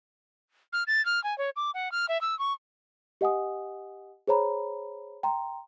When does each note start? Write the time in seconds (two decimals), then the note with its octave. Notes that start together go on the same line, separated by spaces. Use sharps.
0.73 F6
0.87 A6
1.06 F6
1.24 G#5
1.38 C#5
1.56 D6
1.74 F#5
1.92 F6
2.09 E5
2.21 E6
2.39 C#6
3.21 G4 D#5 F#5 G#5 D#6
4.28 G#4 C5 C#5 A#5 B5
5.23 G5 A#5 C6